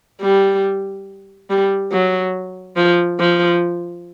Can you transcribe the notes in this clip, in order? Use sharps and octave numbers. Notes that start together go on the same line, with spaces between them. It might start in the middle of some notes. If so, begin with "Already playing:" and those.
G3
G3
F#3
F3
F3